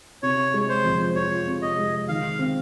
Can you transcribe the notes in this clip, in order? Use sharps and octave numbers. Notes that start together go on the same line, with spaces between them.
C3 C#5
G#3
C5
F2
F3 C#5
C3
D#5
G#3
D#3 F5
C4